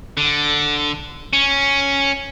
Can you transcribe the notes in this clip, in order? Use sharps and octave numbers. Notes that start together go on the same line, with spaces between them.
D3
C#4